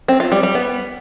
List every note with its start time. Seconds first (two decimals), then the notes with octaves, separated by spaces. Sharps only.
0.08 C4
0.20 F4
0.32 G3
0.43 G3
0.55 B3